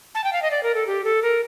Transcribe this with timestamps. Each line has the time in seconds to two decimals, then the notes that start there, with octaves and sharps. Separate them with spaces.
0.15 A5
0.24 G5
0.33 F5
0.42 D#5
0.51 D5
0.63 A#4
0.75 A4
0.87 G4
1.04 A4
1.22 A#4